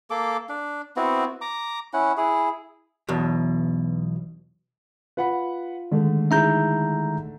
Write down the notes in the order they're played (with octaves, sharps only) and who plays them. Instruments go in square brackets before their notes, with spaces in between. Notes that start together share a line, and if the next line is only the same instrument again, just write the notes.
[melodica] A#3 A4 D6
D4
B3 C4 E4 F#4
A#5 D6
C#4 E4 F#5
E4 G#4
[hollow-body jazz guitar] B1 E2 B2
[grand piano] F4 [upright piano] B4 F#5 B5
[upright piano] D3 A3 [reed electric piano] D#3 G#3
[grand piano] D#4 E4 G#4 [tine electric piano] E5 A#5 G6